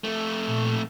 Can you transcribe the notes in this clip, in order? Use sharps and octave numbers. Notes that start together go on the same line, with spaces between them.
F2 A3
A#2